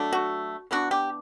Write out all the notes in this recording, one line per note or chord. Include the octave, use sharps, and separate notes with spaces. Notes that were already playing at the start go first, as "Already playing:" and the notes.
Already playing: F#3 A3 D4
F#4
E3 B3 D4 F#4
G4